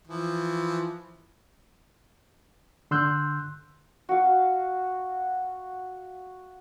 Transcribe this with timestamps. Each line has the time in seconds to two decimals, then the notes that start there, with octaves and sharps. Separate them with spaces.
0.08 E3 F3
2.91 D3 C6 E6 F#6 G6
4.09 F#4 F5